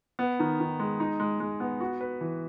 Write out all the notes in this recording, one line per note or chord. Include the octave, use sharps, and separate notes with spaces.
B3
D#3
D#3
G#3
D#4
G#3
G#3
B3
F#4
B4
E3